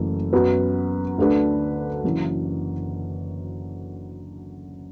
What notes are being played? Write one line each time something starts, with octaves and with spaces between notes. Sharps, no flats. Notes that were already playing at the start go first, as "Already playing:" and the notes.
Already playing: F#1 F#2 E3 A3
F#2 F#3 B3 F#4 B4
D2 D3 A3 D4 B4
F#1 F#2 E3